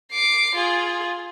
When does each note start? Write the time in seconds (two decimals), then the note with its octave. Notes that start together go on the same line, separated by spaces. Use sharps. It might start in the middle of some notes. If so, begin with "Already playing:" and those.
0.12 D6 C7
0.55 F4 G#4